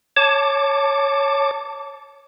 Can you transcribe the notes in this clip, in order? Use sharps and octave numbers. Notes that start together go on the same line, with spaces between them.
C#5 A5 D6